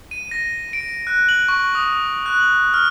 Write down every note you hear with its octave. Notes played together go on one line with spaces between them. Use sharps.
D#7
A#6
D7
F#6
F#7
C#6
D#6
F#6
F#7
F6